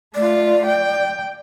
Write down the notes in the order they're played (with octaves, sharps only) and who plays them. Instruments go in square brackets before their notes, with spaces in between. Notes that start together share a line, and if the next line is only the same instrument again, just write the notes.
[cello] A3 F4 [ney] D5
[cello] G5